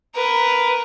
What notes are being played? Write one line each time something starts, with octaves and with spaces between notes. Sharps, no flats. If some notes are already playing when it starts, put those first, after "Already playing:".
A#4 B4